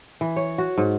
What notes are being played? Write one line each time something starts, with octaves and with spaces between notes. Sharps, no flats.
E3
C#5
F#4
G#2